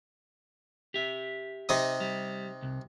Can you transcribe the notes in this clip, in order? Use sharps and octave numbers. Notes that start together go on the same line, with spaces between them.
G4 E5
C3 D#4 D#6
G3
C2